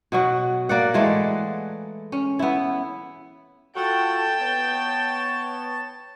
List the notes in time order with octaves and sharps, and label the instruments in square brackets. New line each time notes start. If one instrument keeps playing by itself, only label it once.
[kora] B2 F#3 F#4
A#3 D5 F#5
E3 G#3 A3
C#4
B3 E4
[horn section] F4 F#4 A4 [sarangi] G5 [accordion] A5
[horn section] B3 C#5